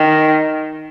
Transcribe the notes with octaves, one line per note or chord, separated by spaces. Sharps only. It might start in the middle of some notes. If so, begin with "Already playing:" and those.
Already playing: D#3